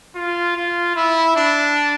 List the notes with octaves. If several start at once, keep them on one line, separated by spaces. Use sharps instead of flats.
F4
F4
E4
D4